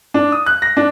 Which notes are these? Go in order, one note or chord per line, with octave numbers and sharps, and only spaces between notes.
D4
D#6
F#6
A#6
D4